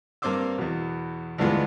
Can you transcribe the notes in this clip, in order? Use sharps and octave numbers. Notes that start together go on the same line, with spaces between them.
G2 A#3 C4 C6 D6 E6
E2 B2
D2 G2 E3 G#3 B3 F4